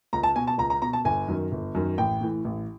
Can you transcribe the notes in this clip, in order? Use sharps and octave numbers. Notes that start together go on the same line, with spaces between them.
C#2 A#5
A5
B2 G#5
A5
C#2 A#5
A#5
B2 A#5
A5
G1 G#5
F#2 D#3
G1
F#2 D#3
A1 G5
A2 E3
A1